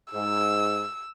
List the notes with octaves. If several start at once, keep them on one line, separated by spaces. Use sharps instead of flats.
G#2 E6